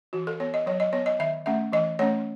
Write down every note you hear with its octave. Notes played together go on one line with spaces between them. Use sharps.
E3 F#4
A4
B3 C#5
D#5
F#3 C#5
D#5
B3 C#5
D#5
D#3 E5
A3 C#4 E5
E3 D#5
A3 C#4 C#5